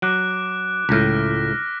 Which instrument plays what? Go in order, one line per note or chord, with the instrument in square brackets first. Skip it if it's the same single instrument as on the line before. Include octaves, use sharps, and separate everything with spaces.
[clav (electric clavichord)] F#3 [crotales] D6 F#6 D7
[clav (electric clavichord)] C#2 A2 [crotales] F6 A#6 B6